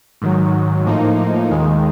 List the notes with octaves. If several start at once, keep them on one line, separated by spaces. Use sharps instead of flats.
G#2 D#3 F#3
A2 F3 A#3 D#4
D#2 D#3 G#3